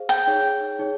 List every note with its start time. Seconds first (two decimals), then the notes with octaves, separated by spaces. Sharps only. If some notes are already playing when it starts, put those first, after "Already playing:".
Already playing: G#4 C5 F5
0.09 G5
0.27 D#4 G#4 C#5
0.79 D#4 G#4 C#5